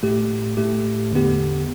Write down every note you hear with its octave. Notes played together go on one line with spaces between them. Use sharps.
A2 A3 G4
A2 A3 G4
E2 D3 B3 G4